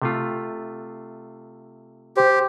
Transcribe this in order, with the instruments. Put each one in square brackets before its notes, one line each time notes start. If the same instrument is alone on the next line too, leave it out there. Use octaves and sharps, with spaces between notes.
[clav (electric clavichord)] C3 A3 F4
[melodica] G4 [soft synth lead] C5